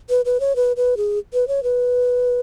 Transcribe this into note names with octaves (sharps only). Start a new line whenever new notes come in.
B4
B4
C#5
B4
B4
G#4
B4
C#5
B4